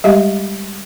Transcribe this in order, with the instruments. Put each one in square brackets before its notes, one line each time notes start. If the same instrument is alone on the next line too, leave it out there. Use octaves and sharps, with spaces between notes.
[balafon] G3 G#3 G4 D#5 F5